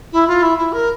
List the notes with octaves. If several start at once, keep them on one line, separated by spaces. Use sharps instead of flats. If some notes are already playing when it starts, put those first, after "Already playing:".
E4
F4
E4
E4
A#4